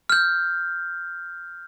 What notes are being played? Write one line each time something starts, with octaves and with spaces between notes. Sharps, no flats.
F6 G6